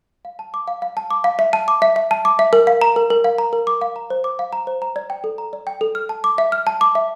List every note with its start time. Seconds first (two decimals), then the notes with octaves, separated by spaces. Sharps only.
0.25 F5
0.39 A5
0.54 D6
0.68 F5
0.82 F5
0.97 A5
1.11 D6
1.24 F5
1.39 E5
1.53 A5
1.68 D6
1.82 E5
1.96 E5
2.11 A5
2.25 D6
2.39 E5
2.53 A#4
2.67 F5
2.81 A#5
2.96 A#4
3.10 A#4
3.24 F5
3.38 A#5
3.53 A#4
3.67 D6
3.81 F5
3.96 A#5
4.10 C5
4.24 D6
4.39 F5
4.53 A#5
4.67 C5
4.82 A#5
4.96 D5
5.10 G5
5.24 A4
5.38 A#5
5.53 D5
5.67 G5
5.81 A4
5.95 F6
6.09 A5
6.24 D6
6.38 E5
6.52 F6
6.67 A5
6.81 D6
6.95 E5